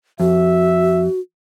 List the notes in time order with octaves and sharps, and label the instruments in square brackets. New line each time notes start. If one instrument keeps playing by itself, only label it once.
[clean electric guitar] F2 [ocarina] F#4 [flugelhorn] E5